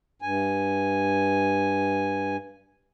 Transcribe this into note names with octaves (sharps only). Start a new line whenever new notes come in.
G2 G#5